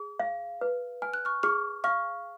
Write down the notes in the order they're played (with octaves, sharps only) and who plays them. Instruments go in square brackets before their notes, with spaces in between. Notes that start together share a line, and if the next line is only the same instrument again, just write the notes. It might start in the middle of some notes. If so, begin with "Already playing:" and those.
Already playing: [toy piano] G#4
F5
B4
[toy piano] G#5 [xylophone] F6
[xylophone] F#6
C#6 F6
[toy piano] G#4 [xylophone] C#6 F6
[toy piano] F5 [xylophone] C#6 F6